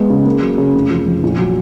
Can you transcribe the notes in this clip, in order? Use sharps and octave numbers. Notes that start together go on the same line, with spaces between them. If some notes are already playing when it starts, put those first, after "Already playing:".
Already playing: G#3 B3
C#3
A#3
F#3
C#3
F1
F3
F2
A#1
F#3